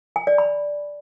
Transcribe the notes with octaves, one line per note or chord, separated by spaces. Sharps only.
G#5
D5
B5